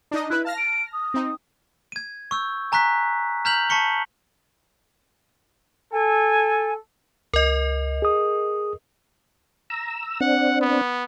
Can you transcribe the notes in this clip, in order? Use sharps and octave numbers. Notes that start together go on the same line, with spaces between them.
D4 D#4 D#5
E4 B4 F#6
F5 A5 F6 A#6
D7
D#6
C4 D#4
G#6 D#7
C#6 E6 G6
G#5 A#5 C#6 F#6 B6
A#5 F6 G6 B6 F7 F#7
A5 C#6 B6 C#7 G7
A4 G#5
C#2 A#4 D#5
G#4 D#6
A#5 E6
C4 D4 F#5
B3